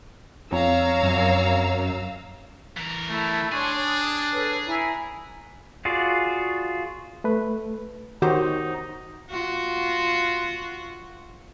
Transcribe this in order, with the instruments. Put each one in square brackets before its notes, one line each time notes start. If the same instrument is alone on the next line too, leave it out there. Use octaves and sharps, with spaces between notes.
[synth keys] F2 [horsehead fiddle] C#5 [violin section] F5 A#5 E6
[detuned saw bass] F#2
[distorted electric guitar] E3 A#4
[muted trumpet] A3 [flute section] E4 A5
[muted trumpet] D4 [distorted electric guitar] G#4 [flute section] C#5 C6 C#6
[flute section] D#6
A4 B4 C#5
E4 G#5 A#5
[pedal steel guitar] F4 F#4 G#4 D5
[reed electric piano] A3 B4
[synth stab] D#3 G4 C5 [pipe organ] D#4 [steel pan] F#4
[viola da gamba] F4 F#4